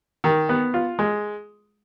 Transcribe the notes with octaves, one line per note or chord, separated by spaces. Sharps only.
D#3
B3
F4
G#3